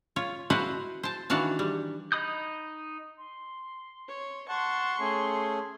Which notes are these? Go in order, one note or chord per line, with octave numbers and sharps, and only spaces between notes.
F4 C#5
E4 F#4 B4 C5 D#5 F5
C5 A5
D#3 E3 D4 F#4 F5 A5
G3
D#4 D#5 B5 D#6 G6
C6
C#5
F#5 A5 C6 C#6
A3 C#4 G#4